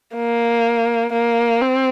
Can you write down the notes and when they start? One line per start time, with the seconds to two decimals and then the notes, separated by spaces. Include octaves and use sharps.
0.15 A#3
1.13 A#3
1.61 C4